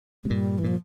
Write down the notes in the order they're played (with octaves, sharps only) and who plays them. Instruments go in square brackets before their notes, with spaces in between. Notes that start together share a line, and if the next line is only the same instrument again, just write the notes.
[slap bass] C3 [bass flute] G#3
[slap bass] G2 A#2 [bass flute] G3
[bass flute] E3
[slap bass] A#2 [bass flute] F3